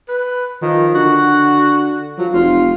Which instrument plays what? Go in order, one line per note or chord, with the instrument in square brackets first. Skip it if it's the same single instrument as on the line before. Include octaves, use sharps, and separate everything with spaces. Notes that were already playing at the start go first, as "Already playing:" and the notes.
[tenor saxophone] B4
[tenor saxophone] D#3 [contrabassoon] F3
[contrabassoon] D3 [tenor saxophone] F#4
[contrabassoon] F3 [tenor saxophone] F#3
[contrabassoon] F1 [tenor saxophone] F4